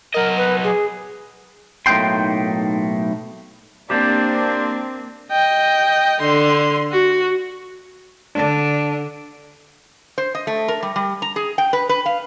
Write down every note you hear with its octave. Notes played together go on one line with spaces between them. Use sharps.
F#3 A#4 D#5
B4
G#4
B1 A2 A#3 D#4 G5 C6
A#3 C4 D4 G4 C5 D5
D#5 G5
D3 C6
F#4
D3 D4 A5
C5
D#5
A3
A#4
G3
G3
A#5
G#4
G5
B4
B4
F5